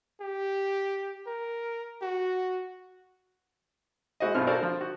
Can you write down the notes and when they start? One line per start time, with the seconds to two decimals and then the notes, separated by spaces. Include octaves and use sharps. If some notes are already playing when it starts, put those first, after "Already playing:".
0.21 G4
1.27 A#4
2.02 F#4
4.20 G#3 E4 F#4 C5 D#5
4.34 B1 G2 B2 F4 F6
4.47 F#4 A4 A#4 C5 D5
4.60 D3 F3
4.81 F#4